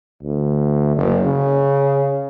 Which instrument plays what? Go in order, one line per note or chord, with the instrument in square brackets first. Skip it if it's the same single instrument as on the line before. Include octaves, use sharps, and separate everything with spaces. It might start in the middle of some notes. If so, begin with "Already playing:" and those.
[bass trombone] D2
F#1
C#3